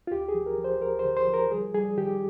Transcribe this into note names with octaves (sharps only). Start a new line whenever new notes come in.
F4
D2 G4
G#4
F3
A#4
F3
C5
D2 A#4
C5
D3
C5
F3
A#4
G3 G#4
G3 G#4
D#3 G4